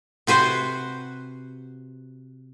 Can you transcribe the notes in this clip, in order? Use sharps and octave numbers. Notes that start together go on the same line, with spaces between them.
C3 F#4 B4 C5